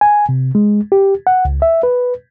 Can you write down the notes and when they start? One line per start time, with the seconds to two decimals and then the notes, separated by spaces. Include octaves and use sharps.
0.01 G#5
0.29 C3
0.55 G#3
0.92 G4
1.27 F#5
1.45 C#2
1.62 E5
1.83 B4